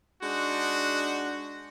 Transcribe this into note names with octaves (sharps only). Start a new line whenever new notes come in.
G#3 D4 D#4 F#4